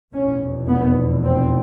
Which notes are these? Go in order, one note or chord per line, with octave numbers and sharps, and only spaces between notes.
F1 E2 B2 C#4
B3
C4